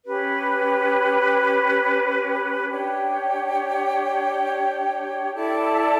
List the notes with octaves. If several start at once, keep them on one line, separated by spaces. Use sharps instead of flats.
C#4 G4 B4
D4 G4 C#5 G5
E4 A4 D5 A5